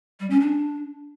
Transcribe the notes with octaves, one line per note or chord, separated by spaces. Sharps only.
G3
C#4
D4